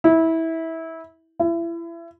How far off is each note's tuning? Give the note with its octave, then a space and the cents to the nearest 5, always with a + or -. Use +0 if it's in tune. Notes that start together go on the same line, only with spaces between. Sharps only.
E4 -20
E4 +30